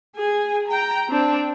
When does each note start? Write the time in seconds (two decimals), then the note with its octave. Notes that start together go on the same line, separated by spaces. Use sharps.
0.16 G#4 G#5
0.68 G5 A#5
1.09 C4 D4